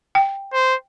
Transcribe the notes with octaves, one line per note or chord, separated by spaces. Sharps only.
G5
C5